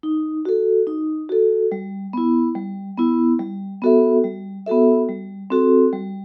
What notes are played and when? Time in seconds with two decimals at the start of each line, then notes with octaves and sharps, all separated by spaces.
0.03 D#4
0.45 F#4 A4
0.87 D#4
1.29 F#4 A4
1.72 G3
2.13 B3 E4
2.55 G3
2.97 B3 E4
3.40 G3
3.82 B3 F#4 A4 E5
4.24 G3
4.66 B3 F#4 A4 E5
5.09 G3
5.50 C4 F#4 A4
5.93 G3